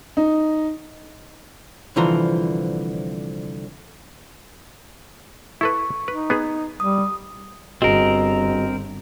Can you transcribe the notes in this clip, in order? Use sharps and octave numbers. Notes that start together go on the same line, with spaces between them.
D#4
C2 D3 E3 F3 F4 A#5
E4 A4 B4 C#6
D#4 B4
B3 G#4
G3 D#6
G1 C4 F#4 G#4 A#4 D#5